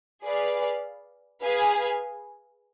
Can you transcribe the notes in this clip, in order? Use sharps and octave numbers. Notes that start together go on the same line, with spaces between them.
G#4 B4 D5 F5
G#4 B4 F5 G#5